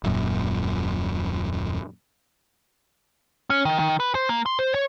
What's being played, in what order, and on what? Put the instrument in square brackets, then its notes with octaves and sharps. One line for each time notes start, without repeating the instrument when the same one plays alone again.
[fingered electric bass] D#1 F#2 A#2
[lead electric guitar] C#4
D#3
D#3
B4
C5
A#3
C6
C5
C#5